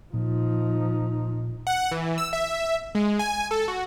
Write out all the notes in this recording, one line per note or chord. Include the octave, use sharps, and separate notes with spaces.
A#2 F3 D#4
F#5
E3
E6
E5
G#3
G#5
A4
F#4